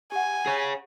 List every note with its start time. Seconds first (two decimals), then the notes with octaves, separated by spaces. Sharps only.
0.12 G4 F#5 G#5
0.46 G#4 C#5